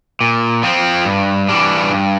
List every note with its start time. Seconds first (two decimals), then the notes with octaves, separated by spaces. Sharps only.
0.21 A#2
0.63 F3 C4
1.05 G2
1.49 E3 G3 D4
1.91 G2